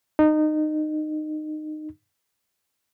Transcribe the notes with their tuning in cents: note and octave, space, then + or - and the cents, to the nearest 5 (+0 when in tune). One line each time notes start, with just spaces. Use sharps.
D#4 -20